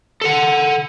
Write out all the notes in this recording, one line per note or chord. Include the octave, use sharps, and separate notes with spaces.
A4 F#5